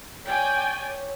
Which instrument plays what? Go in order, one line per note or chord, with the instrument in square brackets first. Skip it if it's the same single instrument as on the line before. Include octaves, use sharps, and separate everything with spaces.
[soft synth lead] C#5 [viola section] D5 G5 G#5